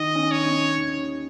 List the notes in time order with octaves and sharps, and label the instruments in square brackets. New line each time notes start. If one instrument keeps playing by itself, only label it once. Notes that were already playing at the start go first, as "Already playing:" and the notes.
Already playing: [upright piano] D#3 [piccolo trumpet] D#5
[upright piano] C#4
[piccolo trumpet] C#5
[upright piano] C#4
D#2